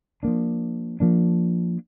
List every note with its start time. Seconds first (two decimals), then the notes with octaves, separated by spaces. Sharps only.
0.23 F3 A#3 D4
1.00 F3 A#3 D4